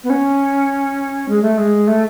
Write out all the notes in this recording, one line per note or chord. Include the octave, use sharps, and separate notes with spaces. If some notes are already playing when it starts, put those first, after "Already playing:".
B3
C#4
G#3
A3
G#3
A3